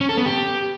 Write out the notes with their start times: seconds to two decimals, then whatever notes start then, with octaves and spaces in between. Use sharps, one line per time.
0.01 C#4
0.09 A4
0.17 B3
0.26 G4